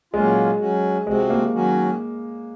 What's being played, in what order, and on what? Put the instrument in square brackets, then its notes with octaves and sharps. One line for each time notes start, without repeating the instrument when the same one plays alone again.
[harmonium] A#2 F#3 A#3 C#4 F4 [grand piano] G#3
[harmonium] F#3 C#4 F#4
[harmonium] C3 F3 C4 F#4 [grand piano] G#3
[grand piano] A#3
[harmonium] D#3 F#3 C#4 F#4